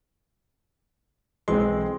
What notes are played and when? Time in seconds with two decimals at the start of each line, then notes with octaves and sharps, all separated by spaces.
1.48 B1 E3 G#3 C4 C6